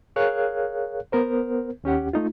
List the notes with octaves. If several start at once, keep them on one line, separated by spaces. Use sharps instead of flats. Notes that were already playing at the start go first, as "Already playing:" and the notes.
G#4 A#4 C#5 F5 F#6
B3 A#4 C5
D#2 C#4 G4 F#5
A3 D#4 F4